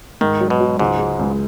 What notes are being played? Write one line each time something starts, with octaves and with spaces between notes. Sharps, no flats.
G#2 D#3
F#3
B2
F#3
C#2 G#2
G#3
C#2